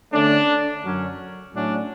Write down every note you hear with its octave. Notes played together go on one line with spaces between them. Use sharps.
D3 A3 C#4 D4
F#2 D3 F#3 C#4
A2 F#3 A3 C#4 D4